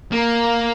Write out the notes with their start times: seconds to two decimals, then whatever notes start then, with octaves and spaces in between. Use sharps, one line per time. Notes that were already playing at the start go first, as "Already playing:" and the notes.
0.12 A#3